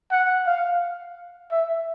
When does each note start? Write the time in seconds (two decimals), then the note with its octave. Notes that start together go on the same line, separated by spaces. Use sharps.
0.12 F#5
0.47 F5
1.52 E5